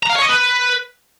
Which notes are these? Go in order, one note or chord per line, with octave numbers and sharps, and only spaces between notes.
A#5
F5
C#5
D#5
B4